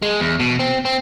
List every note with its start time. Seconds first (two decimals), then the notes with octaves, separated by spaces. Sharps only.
0.02 G#3
0.20 E2
0.40 B2
0.59 C4
0.85 C4